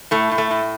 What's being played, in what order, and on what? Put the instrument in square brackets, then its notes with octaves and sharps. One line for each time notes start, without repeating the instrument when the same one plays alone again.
[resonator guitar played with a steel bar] A2 A3
A2
A3
A2